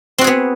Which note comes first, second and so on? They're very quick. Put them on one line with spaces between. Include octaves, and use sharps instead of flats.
C4 F#4 G#4 B3